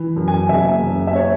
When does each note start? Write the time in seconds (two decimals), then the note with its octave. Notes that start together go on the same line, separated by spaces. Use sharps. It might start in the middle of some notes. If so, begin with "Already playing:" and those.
Already playing: E3
0.16 F#2
0.28 G#5
0.49 F#1 E5
0.83 F#1
1.07 E5
1.16 C#5